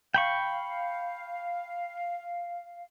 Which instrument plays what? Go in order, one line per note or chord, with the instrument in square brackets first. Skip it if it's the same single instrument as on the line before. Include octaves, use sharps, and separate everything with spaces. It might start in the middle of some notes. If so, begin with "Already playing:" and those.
[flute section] F5 [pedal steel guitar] G5 B5 C#6